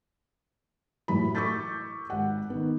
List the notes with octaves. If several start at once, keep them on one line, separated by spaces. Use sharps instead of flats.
F#2 A2 E3 B5
C#6 D6 E6 G6 A6 B6
G#1 F#5
D#3 B3